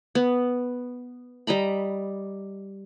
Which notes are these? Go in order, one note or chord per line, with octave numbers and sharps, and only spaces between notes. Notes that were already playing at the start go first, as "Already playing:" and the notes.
B3
G3 D#5 A#5 B5